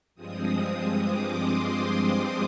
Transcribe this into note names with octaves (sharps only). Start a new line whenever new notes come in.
G2 F3 G#3 C4 D#6
D6
C6
C6
C6